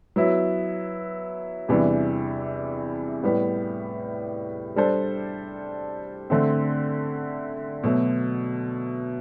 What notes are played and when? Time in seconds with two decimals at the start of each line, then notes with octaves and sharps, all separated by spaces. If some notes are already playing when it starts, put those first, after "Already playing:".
0.16 F#3 B3 E4
1.69 E2 C3 E3 G3 D4
3.23 A2 G3 B3
4.76 G3 D4 A4 C5
6.30 D3 A3 C4
7.84 B2 F#3 A3